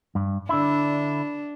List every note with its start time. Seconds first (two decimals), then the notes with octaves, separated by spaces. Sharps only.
0.15 G2
0.49 D3 D4 E4